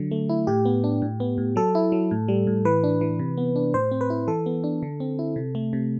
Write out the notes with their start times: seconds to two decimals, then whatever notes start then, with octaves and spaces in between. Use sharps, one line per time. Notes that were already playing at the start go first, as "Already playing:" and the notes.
Already playing: D3 F#3
0.11 A3
0.29 E4
0.47 A2 G4
0.65 B3
0.84 D4
1.02 A2
1.20 B3
1.38 A2
1.56 F#3 A4
1.75 E4
1.92 F#3
2.11 A2
2.28 G3
2.47 A2
2.65 E3 B4
2.84 D4
3.01 E3
3.19 C3
3.38 B3
3.56 D4
3.74 A2 C5
3.91 C4
4.01 B4
4.10 E4
4.28 E3 A4
4.46 B3
4.64 D4
4.83 D3
5.00 C4
5.19 E4
5.36 C3
5.55 A3
5.73 C3